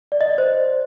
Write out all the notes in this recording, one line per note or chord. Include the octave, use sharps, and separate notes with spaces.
D5
D#5
D5
C5